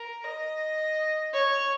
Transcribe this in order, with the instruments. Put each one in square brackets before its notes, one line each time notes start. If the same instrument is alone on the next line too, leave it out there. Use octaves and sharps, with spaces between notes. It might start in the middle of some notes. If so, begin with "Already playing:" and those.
Already playing: [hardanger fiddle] A#4
D#5
C#5